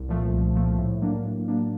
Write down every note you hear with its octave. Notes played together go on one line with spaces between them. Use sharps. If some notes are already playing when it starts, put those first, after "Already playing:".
Already playing: C2
A#2 F3 A3
C2
A#2 F3 A3
A2
F#3 A#3 D4
A2
F#3 A#3 D4